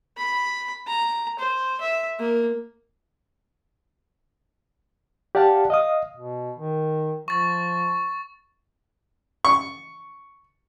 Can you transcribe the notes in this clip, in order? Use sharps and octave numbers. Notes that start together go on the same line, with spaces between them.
B5
A#5
C5
E5
A#3
G4 D5 F5 F#5 A5
D#5 F5 D#6
B2
D#3
F3 C#6 A6
C#6